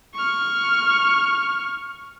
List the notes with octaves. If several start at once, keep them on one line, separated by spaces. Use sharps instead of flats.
C#6 F6